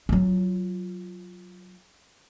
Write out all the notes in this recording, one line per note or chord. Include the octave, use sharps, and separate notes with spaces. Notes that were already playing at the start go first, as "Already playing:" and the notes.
F#3 F4